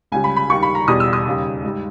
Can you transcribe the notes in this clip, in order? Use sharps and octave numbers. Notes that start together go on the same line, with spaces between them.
C#2 C#3 G3 G#5
B5
B5
D#2 D#3 G3 C#6
B5
A#5
E2 B2 G3 D#6
E6
D#6
D#2 C#3 G3
G#2 G3